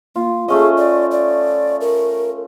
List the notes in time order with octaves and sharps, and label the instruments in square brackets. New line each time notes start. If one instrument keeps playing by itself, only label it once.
[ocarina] A#3 [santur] F4
[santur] A3 C#4 D#5 [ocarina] G#4
[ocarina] D5
D5
A#4